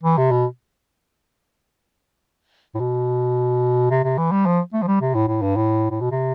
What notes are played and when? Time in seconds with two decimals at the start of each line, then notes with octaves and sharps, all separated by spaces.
0.03 E3
0.17 C3
0.31 B2
2.75 A2
2.80 B2
3.90 C3
4.04 C3
4.18 E3
4.31 G3
4.46 F3
4.73 A3
4.82 F3
4.87 G3
5.01 C3
5.14 A2
5.28 A2
5.42 G2
5.56 A2
5.91 A2
6.01 B2
6.11 C3